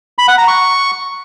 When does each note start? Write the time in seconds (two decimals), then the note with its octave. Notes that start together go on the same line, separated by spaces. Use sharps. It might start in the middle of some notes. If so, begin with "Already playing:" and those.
0.18 B5
0.28 F#5
0.38 A#5
0.48 C#6